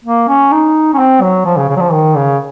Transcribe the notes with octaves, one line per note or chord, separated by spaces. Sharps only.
A#3
C#4
D#4
C#4
C4
F#3
F3
C#3
C#3
F#3
F3
D#3
C#3